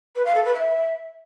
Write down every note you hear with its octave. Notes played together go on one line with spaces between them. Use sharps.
B4
F5
A4
B4
E5